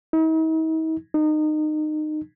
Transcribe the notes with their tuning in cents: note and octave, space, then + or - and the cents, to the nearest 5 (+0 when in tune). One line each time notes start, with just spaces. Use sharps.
D#4 +45
D#4 -25